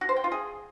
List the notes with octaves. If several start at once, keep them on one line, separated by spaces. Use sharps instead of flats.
F#4
C5
G5
F4
G#4